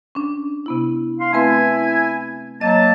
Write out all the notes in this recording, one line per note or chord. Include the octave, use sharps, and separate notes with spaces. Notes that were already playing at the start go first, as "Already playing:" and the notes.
C#4 D4
C3 B3 E4
F5 C6
A3 C4 E4 B4 E5 G#5
F#3 A#3 D#5 A5